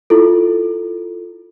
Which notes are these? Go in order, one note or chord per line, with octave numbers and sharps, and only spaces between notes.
E4 F4 A4